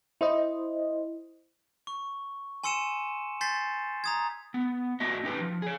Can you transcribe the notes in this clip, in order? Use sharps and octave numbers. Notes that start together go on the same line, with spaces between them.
E4 C5 D#5
C#6
G#5 C6 E6 C#7 D#7 E7
G#5 C6 G6 A6 B6 C7
A#5 D#6 G#6
B3
A#3 D4 F#4 D#5 E5
C#4 D#4 G4 A4 B4 C5
F3
G#4 C#5